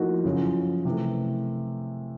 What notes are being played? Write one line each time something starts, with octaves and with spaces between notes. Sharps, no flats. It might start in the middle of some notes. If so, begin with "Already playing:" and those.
Already playing: A2 F3 A#3 D#4 F#4
F#2 C#3 F3
C3 E3 A3